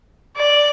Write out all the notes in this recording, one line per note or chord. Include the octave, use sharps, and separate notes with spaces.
D5